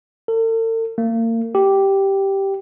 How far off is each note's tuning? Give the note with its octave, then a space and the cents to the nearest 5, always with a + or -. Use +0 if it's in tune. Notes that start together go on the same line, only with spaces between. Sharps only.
A4 +45
A#3 -35
G4 -5